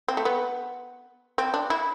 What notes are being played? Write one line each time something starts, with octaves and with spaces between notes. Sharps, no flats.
C4
A3
B3
C4
D4
E4